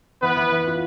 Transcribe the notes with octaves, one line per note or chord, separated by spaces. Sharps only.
E3 B3 B4
E3
E3
F4